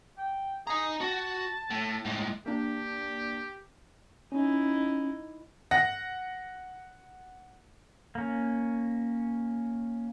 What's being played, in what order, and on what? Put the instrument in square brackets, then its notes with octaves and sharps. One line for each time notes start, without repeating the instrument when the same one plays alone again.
[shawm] G5
[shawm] G#4 [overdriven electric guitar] D#5 A#5
[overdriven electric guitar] F#4 [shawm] A5
[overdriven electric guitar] A2
A2 G#3
[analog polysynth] A#3 D4 [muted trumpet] G4
[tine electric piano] C#4 [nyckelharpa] D#4 E4
[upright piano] F#5 A#6
[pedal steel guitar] A#3 C#4